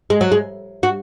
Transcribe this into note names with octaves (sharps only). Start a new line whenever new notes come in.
G#3
F#3
G#3
F#4